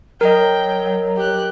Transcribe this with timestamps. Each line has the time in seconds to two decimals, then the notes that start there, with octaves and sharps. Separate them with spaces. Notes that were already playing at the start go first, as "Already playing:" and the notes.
0.21 F#3 A#4 D#5 G5
1.16 G4 F#6